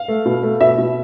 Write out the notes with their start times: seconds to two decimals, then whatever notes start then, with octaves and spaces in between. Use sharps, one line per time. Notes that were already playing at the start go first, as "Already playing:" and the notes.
Already playing: F5
0.08 A3
0.26 B2
0.43 A3
0.61 B2 E5
0.78 B2